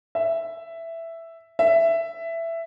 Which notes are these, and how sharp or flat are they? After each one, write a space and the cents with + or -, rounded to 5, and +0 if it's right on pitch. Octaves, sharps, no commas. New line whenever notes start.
E5 +5
E5 +10